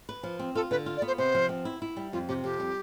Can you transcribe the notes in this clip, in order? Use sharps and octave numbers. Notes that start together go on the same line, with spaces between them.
B4
F3
C4
F4 A4
D3 B4
F4
D5
B3
C5
C3 C5
F3
C4
E4
E4
G3
F2 F4
C3 G4
F2 G4
G3